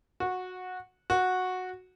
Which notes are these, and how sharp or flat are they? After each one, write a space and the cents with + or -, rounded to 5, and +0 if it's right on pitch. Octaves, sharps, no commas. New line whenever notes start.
F#4 -15
F#4 -10